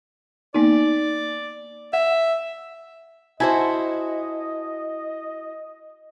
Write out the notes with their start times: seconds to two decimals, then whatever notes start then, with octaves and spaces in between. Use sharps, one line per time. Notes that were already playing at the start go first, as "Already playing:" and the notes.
0.54 A#3 B3 D#4 D5
1.93 E5 F#5
3.40 E4 F#4 C5 D#5 G#5 A5